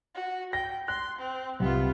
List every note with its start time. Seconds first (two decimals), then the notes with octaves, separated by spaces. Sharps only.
0.15 F#4
0.53 G5 A#6
0.88 C6 F#6
1.18 C4
1.60 C2 B3 F4